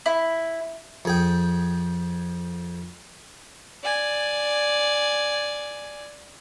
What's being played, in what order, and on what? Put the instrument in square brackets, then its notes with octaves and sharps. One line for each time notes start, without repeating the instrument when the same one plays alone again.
[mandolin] E4
[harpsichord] F2 G#4 G5
[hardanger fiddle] D5 G#5